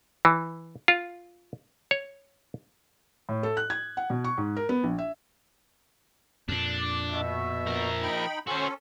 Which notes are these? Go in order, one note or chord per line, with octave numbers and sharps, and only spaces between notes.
E3
F4
C#5
A2
A4
F#6
G#6
F#5
B2
C#6
G#2
A#4
B3
A#1
E5
F2 A#2 D4
D6
B2 E5
F3 A#4
D#4 G5 B5
C#4 F#4 A4 C5 C6